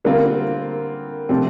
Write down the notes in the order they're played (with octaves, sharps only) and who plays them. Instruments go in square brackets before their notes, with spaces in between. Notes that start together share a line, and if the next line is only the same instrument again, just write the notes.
[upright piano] D3 G3 C4 F4 [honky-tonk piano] A#3
[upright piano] C3 F3 A3 D4 [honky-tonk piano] C4